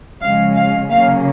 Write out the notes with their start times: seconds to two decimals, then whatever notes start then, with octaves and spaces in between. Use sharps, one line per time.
0.22 C#3 F3 G#3 C#4 F5
0.56 F5
0.90 C#3 F#3 A#3 C#4 F5